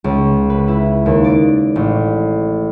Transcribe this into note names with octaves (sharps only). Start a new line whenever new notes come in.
C#2
B4
E4
D#2
D5
A1